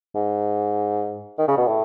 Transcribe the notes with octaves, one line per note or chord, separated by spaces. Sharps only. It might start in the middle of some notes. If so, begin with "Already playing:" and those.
G#2
D#3
C#3
B2
A2